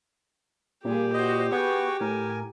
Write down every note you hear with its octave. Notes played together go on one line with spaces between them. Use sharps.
A#2 G3 G4 G#4
F#4 C5 D#5
B3 F#4 G#4 G5 C#6
A2 A#4 G#5